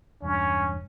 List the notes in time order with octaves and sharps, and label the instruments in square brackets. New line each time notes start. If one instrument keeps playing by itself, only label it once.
[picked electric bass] E1 G2 [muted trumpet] C#4